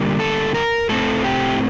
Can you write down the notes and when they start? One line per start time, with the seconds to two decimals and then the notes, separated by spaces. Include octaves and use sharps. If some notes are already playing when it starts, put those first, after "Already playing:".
Already playing: D3 G3 A#3
0.20 A4
0.54 A#4
0.89 A2 A3 C4 A4
1.24 G4